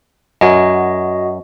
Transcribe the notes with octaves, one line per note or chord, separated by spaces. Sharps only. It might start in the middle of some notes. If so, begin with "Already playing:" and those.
F#2 F#4 D#5